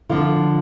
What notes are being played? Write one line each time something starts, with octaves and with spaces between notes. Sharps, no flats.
D3 F3 D4 F4